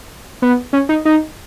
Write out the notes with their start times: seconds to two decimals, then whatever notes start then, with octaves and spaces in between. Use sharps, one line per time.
0.42 B3
0.73 C#4
0.89 D#4
1.05 D#4